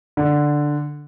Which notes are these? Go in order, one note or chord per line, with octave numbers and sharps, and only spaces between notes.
D3